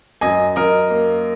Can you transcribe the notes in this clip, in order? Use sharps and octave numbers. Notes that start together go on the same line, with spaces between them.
F#2 D#5 G#5
F#2 A#4 D#5
A#3